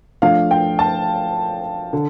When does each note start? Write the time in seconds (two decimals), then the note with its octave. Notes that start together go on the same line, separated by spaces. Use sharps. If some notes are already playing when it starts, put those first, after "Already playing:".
0.22 F3 A3 D4 F4 F5
0.51 G5
0.79 A5
1.93 D3